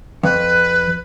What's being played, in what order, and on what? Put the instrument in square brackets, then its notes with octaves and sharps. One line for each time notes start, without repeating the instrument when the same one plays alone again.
[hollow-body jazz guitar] F2 [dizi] B4